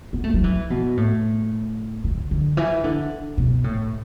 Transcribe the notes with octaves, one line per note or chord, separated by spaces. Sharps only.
B3
A3
F#3
E3
B2
A2
D3
D3
E3
D3
B2
A2